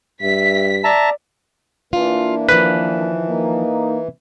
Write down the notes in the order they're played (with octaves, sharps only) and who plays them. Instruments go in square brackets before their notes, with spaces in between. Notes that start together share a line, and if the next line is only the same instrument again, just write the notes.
[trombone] G2 [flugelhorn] E5 [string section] B6
[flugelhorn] D5 [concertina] E5 A5 A#5
[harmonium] E3 [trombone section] A#3 D4 [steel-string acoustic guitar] F4
[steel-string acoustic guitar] D#3 F3 [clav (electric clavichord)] B4
[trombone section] A#3 D#4